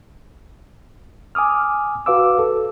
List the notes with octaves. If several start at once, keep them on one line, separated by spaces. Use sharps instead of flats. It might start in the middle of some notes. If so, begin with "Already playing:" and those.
G#5 D6 D#6 F6
F#4 B4 F5 D6 E6
A4